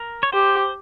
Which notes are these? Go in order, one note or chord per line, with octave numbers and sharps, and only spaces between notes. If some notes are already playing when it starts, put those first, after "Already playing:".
Already playing: A#4
C#5
G4 C5